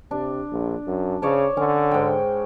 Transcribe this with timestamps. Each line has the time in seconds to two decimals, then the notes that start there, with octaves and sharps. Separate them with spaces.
0.11 C3 D4
0.51 A#1
0.87 F#2
1.22 C#3 C#5 D5 A5
1.57 D3 C#4
1.91 G#2 G5